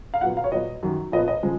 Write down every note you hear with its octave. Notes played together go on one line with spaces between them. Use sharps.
F5
A#2 F#3 B3 F#5
F5
C#5
A#2 F#3 B3 D#5
F#2 D#3 F#3
A#2 F3 B3 D#5
D#5
C#3 F3 G#3